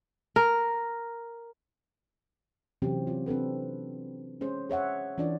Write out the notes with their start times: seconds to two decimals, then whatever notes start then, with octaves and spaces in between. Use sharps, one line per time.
0.36 A#4
2.82 C3 E3 F#3 C4 C#4 G4
3.07 F4 F#4
3.26 C4 D4 A4 B4
4.41 G#3 C#4 G#4 C5
4.70 G#4 C#5 E5 F#5
5.18 E3 C#4 D4 F4 D5